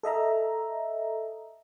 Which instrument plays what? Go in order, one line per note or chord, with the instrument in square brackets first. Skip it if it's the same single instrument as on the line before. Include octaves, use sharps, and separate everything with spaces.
[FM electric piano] A4 D#5 E5 A#5